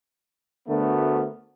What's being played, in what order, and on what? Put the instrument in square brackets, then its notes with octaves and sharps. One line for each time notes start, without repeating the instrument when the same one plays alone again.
[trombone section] D2 D3 A3 B3 F#4 A#4